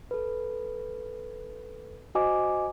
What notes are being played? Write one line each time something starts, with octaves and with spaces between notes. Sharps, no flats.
A4 B4
F#4 C5 D#5 G#5 D6